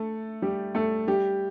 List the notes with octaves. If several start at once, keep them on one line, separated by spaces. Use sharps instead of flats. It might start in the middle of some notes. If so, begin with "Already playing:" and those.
Already playing: A3 A4
G3 G4
A3 A4
G3 G4